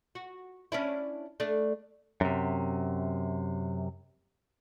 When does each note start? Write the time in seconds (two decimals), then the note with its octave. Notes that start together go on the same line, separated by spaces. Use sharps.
0.15 F#4
0.72 C#4 D4 E4
1.40 A3 D4
2.21 F#2 C3